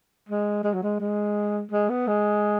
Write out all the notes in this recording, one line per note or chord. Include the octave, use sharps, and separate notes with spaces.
G#3
G#3
F#3
G#3
G#3
G#3
B3
G#3